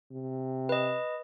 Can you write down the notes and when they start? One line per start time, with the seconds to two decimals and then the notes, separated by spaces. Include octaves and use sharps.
0.12 C3
0.69 B4 D#5